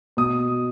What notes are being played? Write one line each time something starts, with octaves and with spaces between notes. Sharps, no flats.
B2 D#6